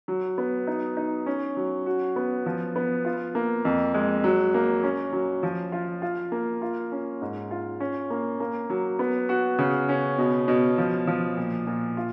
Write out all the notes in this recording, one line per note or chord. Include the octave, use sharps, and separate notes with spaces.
F#3
B3
D#4
D#4
C#4
F#3
F#4
B3
F3
B3
F4
A#3
F2
G#3
F#3
A#3
C#4
F#3
F3
F4
F4
A#3
F4
C#4
G#2
F4
C#4
A#3
A#3
F#3
B3
F#4
C#3
C#4
B2
B2
F3
F3
A#2
A#2
F4